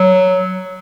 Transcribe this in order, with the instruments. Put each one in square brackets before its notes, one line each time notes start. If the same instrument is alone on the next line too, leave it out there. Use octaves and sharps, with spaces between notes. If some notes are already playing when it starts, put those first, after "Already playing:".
Already playing: [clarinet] F#3